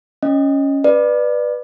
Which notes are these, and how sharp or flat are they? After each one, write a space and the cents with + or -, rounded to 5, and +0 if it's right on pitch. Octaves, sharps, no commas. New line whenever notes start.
C#4 +0 D#5 +0
B4 -5 D5 +20